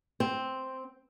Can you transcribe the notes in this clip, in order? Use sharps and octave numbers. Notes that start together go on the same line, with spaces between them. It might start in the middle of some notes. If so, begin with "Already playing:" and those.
C4